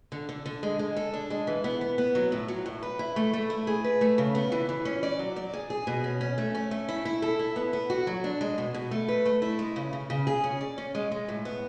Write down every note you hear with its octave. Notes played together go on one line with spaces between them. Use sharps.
D3
D3
D3
G#3
G#3
A4
D4
G#3
E3
B3
B3
B3
F#3
A2
F#3
A2
B4
E4
A3
A3
E4
G#4
B4
A3
C#3
B3
E3
E3
C#4
D5
F#3
D5
G#4
G#4
B2
C#4
C#4
A3
C#4
A3
E4
E4
A4
E4
B3
B3
F#4
F#3
D4
G#3
B2
B2
A3
B4
A3
E4
G#3
C#3
C#3
C#3
G#4
C#4
D5
C#4
G#3
G#3
A2
B3